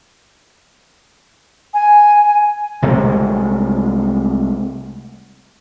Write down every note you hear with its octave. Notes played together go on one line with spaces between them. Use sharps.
G#5
C2 C3 G#3 A3